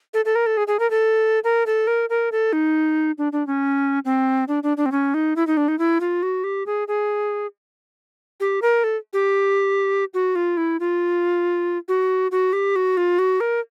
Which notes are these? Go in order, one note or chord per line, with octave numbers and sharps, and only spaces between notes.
A4
A4
A#4
A4
G#4
G#4
A#4
A4
A#4
A4
A#4
A#4
A4
D#4
D4
D4
C#4
C4
D4
D4
D4
C4
C#4
D#4
E4
D#4
D4
D#4
E4
F4
F#4
G4
G#4
G#4
G4
A#4
A4
G4
F#4
F4
E4
F4
F#4
F#4
G4
F#4
F4
F#4
A#4